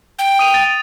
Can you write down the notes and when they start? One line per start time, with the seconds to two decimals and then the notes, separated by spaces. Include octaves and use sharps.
0.19 G5
0.39 D#6 D#7 F7
0.54 A6